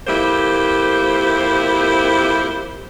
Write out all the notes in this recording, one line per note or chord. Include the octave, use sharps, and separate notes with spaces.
F2 A#3 E4 G4 C5